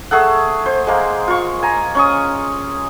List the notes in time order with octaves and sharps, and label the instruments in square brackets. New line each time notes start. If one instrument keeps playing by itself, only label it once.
[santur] A3 G#4 A4 F#5
C5
G#3 A#3
F4 C#6
G#5 A#5
C#4 C#6 D#6